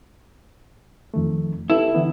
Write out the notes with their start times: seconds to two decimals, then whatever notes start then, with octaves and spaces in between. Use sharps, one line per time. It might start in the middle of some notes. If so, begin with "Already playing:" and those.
1.14 F2 D#3 A3
1.70 E4 G4 A4 B4
1.95 D3 E3 B3